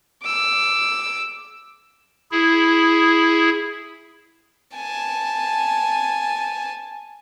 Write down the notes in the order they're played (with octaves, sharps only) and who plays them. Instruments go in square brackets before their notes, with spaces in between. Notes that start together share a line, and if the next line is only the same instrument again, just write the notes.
[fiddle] D6 E6
[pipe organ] E4 G#4
[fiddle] G#5 A5